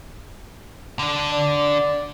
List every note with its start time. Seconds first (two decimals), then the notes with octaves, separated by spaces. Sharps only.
0.99 D3 D4
1.32 D5